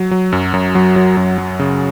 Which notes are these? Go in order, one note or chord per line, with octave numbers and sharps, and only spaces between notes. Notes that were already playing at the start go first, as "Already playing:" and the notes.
Already playing: F#3
F#3
F#2
F#2
F#3
F#3
F#2
F#3
C#3